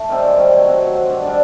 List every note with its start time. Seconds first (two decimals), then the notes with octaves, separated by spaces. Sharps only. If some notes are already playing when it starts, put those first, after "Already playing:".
Already playing: A3
0.09 D#3 G3 C4
0.23 F#2
0.37 D#3 G3 C4
0.52 F#3
0.65 C4 F#4
0.81 F#3
0.94 C4 F#4
1.10 G2
1.23 D3 G3